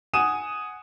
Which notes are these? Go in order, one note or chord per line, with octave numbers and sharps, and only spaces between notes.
F#5 G#5 D#6 D#7 E7